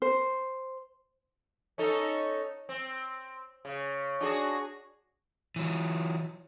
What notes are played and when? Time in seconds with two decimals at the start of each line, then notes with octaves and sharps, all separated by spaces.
0.02 C5
1.78 C#4 D#4 A4
2.69 C4
3.65 C#3
4.21 D4 F#4 G#4
5.56 E3 F#3